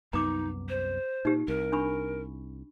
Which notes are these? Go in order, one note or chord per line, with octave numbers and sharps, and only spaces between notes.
C2 F#2 B3 D#4 A#5 D6
C5
A#2 D#4 G4
C2 A#4
D4 B5 C#6